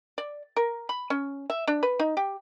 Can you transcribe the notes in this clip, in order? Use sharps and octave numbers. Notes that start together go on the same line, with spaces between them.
D5
A#4
B5
C#4
E5
D4
B4
D#4
G4